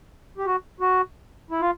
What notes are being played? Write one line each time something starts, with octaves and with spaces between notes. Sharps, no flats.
G4
F#4
F#4
E4
F4